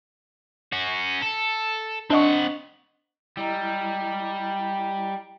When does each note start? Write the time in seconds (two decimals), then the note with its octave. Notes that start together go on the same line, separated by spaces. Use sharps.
0.73 C#4 F#4
1.22 A4
2.10 C4 D4 D#5 F#5 C#6
3.37 G3 E4 D#5 A#5